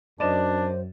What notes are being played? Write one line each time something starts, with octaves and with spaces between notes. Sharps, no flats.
F#2 D4 C5 D5 D#5 E7